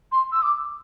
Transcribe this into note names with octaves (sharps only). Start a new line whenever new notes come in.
C6
E6
D6